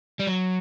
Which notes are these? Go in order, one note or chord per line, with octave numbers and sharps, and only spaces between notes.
G3
F#3